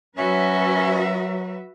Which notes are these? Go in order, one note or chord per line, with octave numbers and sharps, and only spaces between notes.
F#3 C#4 F#4 B4 E5